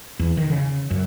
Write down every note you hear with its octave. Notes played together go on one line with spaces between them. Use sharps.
E2
D#3
C#3
F#2